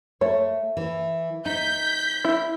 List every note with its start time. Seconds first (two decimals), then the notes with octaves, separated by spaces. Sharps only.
0.21 A3 C#5
0.77 E3
1.46 D#4 G6 B6
2.25 E4